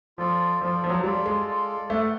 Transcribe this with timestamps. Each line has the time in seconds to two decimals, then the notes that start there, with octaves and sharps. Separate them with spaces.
0.18 F3 F4 A4 D5
0.61 F3 F4 A4 D5
0.84 F3
0.90 F#3
1.04 G3 F4 A4 D5
1.26 G#3
1.47 F4 A4 D5
1.90 A3 G4 B4 D5 F#5